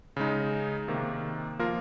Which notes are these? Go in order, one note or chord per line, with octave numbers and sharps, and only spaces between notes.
C#3 G#3 D#4
C3 D#3 A#3
F3 A#3 F4 A#4